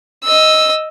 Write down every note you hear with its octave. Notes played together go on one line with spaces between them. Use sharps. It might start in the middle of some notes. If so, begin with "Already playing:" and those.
D#5 E6